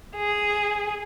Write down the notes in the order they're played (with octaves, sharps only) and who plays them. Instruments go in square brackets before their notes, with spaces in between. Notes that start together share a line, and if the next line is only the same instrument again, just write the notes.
[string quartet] G#4